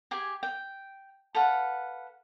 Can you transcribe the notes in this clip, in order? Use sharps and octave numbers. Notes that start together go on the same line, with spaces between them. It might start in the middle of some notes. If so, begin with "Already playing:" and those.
G4 G#4 G#5
G5
A4 B4 F5 F#5